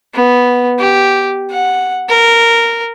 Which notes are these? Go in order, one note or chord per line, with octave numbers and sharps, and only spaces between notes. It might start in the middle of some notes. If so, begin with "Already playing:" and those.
B3
G4
F#5
A#4